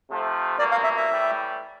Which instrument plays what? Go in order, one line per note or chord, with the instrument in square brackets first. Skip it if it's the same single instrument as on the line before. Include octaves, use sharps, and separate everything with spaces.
[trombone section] C3 F3 A3
[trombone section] C2 B2 F#3 A#3 [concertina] D5
[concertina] F5
E5
E5
[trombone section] A2 E3 G3